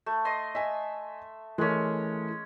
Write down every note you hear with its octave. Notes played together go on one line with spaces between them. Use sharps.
A3
D#5 C6 D#6
D#5 E5 G#5
E3 G#3 A3 C#4 A#4